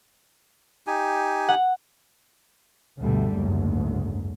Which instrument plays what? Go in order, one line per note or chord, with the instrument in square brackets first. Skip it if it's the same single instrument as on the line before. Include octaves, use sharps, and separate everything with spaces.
[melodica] D#4 G4 G#5
[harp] F#5
[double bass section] D2 G2 B2 D3 G3 A3
F#1 D2 G#2